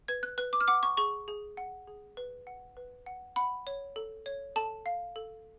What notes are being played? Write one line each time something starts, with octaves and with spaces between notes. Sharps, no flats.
B4 G#6
F#6
B4 F#6
D6
F6
F#5 D6
C#6
G#4 C#6
G#4
F#5
G#4
B4
F#5
B4
F#5
F#5 B5
C#5
A4
C#5
A4 A5
F5
A4